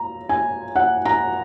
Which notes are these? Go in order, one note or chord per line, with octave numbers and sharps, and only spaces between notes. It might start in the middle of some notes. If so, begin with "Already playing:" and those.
Already playing: A#5
G#5
F#5
A#5